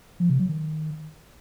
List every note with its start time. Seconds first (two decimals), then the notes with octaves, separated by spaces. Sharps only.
0.20 F3
0.30 C3
0.39 F#3
0.49 D#3